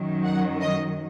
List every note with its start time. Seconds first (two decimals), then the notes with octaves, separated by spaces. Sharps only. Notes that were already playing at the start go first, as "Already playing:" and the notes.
Already playing: F#2 D#3 F#3
0.25 F#5
0.61 D#5